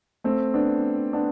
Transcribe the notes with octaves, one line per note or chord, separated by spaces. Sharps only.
A3 C4
B3 D4
B3 D4